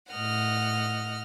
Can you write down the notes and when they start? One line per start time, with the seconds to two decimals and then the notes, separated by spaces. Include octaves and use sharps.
0.12 A2 D#5 F#5 F6